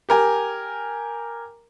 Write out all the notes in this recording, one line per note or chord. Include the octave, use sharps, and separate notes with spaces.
G4 A#4 G#5